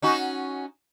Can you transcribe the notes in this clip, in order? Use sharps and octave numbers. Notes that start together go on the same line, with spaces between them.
C#4 D#4 F#4